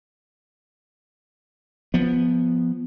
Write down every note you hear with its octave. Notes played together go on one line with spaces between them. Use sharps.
F3 B3